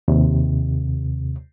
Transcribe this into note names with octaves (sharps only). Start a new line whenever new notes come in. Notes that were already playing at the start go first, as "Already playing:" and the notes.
D#2 C3